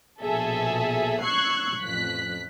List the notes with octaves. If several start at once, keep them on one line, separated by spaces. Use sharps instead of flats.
A#1 B2 G#4 A4 E5
C#6 E6 F#6 G#6 C7
A1 F2 F#6 B6